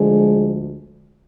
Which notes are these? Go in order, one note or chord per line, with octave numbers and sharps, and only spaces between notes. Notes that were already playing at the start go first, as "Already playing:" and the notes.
Already playing: D2 D3 F3 G#3